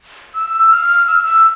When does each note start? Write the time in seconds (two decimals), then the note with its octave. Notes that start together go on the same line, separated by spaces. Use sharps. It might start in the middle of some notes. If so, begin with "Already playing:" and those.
0.35 E6
0.71 F6
1.07 E6
1.25 E6